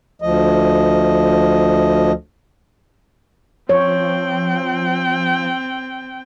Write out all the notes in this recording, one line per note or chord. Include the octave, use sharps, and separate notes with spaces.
D2 F3 D#5
F3 C4 C#5 G5